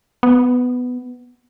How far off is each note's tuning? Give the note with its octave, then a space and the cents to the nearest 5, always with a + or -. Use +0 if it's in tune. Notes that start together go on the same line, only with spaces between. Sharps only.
B3 +10